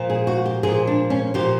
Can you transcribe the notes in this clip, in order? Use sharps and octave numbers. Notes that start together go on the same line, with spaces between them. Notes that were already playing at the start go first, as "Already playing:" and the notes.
Already playing: A#2 F3
G#4
F#4
G4
A#2 F3 G#4
D4
C#4
A#2 F3 G4